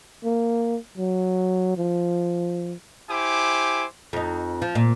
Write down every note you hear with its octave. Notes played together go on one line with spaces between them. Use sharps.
A#3
F#3
F3
E4 G4 C5 G#5 D6
F2 D#4
F3
A#2